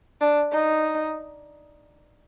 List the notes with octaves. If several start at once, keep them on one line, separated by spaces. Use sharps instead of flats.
D4
D#4